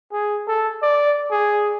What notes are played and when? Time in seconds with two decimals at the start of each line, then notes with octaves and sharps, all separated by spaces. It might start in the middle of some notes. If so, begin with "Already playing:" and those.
0.12 G#4
0.47 A4
0.82 D5
1.31 G#4